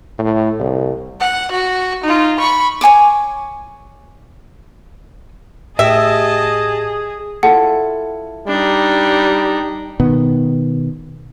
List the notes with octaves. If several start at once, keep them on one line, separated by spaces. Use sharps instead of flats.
A2
C2
F#5
F#4
D#4 F4
B5 C#6
C#5 G#5 C#6 D6
A2 G4 G#4 D#5 E5 A5
E4 F4 A4 F#5
G3 D4 D#4
B2 D#3 B3